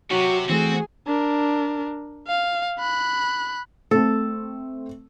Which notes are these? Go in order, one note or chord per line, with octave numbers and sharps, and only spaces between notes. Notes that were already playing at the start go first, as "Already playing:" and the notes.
C3 F#3 F#4
E3 A3 C4 F#4 G#4
D4 A#4
F5
B5 F#6
A3 C4 A4